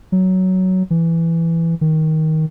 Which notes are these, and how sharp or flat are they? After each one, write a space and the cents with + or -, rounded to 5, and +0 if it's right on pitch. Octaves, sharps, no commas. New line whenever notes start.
F#3 +10
E3 +10
D#3 +15